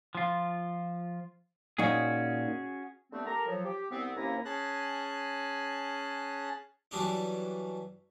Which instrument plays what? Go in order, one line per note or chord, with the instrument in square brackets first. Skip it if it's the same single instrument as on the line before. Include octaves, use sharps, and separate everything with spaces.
[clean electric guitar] F3 F4
[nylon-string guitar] A#2 D#4 G5 [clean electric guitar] C#4 F#4 G#4
[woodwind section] D3 G3 A3 B3 C4 D4
G4 A4 A#4 A#5
F3 F#3
G4
C2 B3 C4
D#2 C3 A#3 C#4 E4 A#5
[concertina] C#4 G#4 A5 F#6
[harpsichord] E3 F#3 G3 D4 D#4